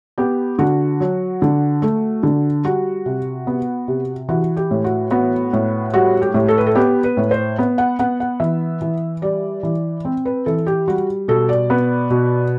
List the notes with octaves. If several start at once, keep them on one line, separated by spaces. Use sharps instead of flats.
B3 G4
D3 F#4
F#3
D3
A3
D3
G3 F#4
C3
B3
C3
E3 F#4
G4
A2
F#4
B3 F#4
A2
G3 F#4
G4
A2
A4
B4
A4
B3 G4
B4
A2
C5
B3
F#5
B3 F#5
F#5
E3 E5
E3
G3 D5
E3
C4
B4
E3 A4
G4
G3 F#4
B2 A4
D5
B3
B2